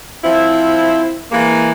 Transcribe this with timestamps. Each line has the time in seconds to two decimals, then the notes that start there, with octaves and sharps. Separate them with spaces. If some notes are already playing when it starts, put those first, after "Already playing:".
0.24 F3 C4 E4
1.32 E3 G#3 A#3